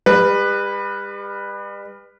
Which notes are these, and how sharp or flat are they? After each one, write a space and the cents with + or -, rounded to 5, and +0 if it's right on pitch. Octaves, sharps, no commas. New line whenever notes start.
G3 +40 B4 +0